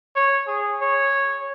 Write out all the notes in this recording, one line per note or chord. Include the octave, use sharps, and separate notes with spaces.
C#5
G#4
C#5